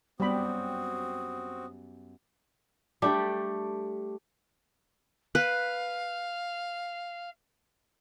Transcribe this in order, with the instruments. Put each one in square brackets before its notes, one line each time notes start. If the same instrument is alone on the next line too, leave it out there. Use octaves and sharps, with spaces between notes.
[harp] F#2 B3 G4 [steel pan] G3 B5 [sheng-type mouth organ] C4 F#4 [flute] D#6
[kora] G3 A3 D4 G4
[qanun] B4 [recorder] F5